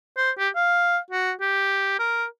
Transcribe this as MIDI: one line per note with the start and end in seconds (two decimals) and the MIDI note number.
0.17 0.31 72
0.38 0.49 67
0.56 0.98 77
1.11 1.32 66
1.41 1.94 67
1.99 2.26 70